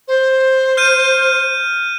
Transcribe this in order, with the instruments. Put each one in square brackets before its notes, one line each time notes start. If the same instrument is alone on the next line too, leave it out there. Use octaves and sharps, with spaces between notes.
[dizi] C5
[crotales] F6 G6 D#7